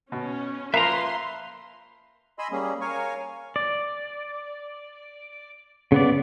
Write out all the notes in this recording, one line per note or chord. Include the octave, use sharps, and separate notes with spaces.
B2 C#4
F3 A#3 A#4 B4 E5 F5 A#5 C6
D#5 G#5 B5 C6 E6
G3 A#3 C#4 G#4
A#4 C#5 F5 G#5 C#6
D5
C#3 B3 D5